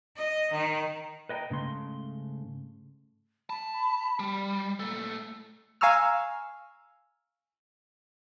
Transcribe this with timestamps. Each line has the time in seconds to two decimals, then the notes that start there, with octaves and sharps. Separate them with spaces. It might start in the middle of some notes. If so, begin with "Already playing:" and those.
0.16 D#5
0.51 D#3
1.29 B4 D#5 G5 A#5
1.50 G#2 C#3 A3 C6
3.50 A5 B5
4.20 G3
4.80 A#2 A3
5.81 F5 G#5 A#5 C#6 E6 F6